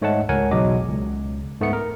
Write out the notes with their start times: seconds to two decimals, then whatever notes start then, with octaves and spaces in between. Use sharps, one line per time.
0.02 G#2 A3 C#5 D#5 F#5 A5
0.29 C#2 A#4 C#5 F#5 G#5
0.51 B1 E2 F#3 D#5 D6
0.89 C#2
1.60 G#2 A3 B3 C#7
1.73 A#4